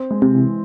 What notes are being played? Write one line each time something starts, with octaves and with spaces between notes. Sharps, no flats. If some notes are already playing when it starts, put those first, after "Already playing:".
Already playing: C4
G#3
C3
E3